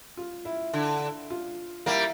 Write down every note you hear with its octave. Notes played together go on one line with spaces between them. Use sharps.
F4
E4
D3
F4
G3 A#3 E4